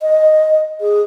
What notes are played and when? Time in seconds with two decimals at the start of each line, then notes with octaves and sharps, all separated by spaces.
0.01 D#5
0.81 G#4